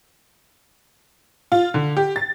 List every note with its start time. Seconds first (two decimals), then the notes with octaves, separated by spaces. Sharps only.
1.52 F4
1.74 D3
1.97 G4
2.16 A6